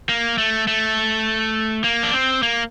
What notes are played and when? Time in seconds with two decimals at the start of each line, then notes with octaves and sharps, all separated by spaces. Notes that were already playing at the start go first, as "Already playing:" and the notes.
0.09 A#3
0.38 A3
0.67 A3
1.84 A#3
2.03 D4
2.13 C4
2.43 A#3